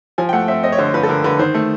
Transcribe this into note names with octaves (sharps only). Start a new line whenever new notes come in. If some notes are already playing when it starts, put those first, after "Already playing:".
F3 G#5
G5
A3 F#5
C4 E5
C4 D#5
C#5
D3 C5
F3 B4
A4
D3 A#4
D3 B4
D#3 C5
A3